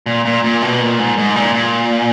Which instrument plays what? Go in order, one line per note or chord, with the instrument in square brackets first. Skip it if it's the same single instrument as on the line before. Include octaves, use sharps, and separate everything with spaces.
[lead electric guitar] A#2
A#2
A#2
B2
A#2
G#2
G#2
A#2
A#2